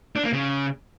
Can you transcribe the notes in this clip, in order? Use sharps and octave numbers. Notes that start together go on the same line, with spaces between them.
D4
A#3
C#3